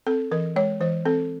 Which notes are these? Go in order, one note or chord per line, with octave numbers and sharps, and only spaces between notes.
C4 A4
E3 A#4
G#3 C#5
E3 C5
C4 A4